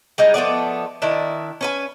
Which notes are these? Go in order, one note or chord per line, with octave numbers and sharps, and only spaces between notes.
G3 G#3 D#4
F3 A3 B3 D5
D#3 D4 E4
C#4 B4 G#5